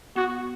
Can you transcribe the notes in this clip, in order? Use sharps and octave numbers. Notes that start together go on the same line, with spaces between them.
B3 F#4